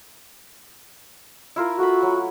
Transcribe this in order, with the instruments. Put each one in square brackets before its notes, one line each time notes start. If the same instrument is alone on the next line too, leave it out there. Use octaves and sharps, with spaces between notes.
[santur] E4 F4 A#4
[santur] A3 B5 [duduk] F#4
[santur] F#3